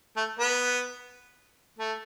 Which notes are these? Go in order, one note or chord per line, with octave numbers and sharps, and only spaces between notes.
A3
B3
A3